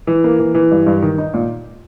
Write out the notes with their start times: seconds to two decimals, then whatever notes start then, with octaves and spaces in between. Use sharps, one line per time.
0.07 E3
0.24 A#3
0.39 E3
0.54 E3
0.71 G2
0.87 G2
1.02 D#3
1.18 D#4
1.34 A#2